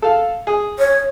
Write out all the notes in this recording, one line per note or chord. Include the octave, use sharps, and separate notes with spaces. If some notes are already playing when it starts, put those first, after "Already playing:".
A4 F5
G#4
C#5